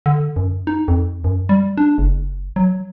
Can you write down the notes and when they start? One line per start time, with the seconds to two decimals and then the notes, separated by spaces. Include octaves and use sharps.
0.06 D3
0.36 F#2
0.67 D#4
0.88 F2
1.24 F#2
1.49 G3
1.77 D4
1.98 F#1
2.56 F#3